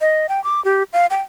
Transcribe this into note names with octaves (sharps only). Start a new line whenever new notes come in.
D#5
G5
D6
G4
F5
G5